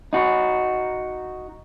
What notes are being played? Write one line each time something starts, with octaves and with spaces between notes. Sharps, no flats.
D#4 F#4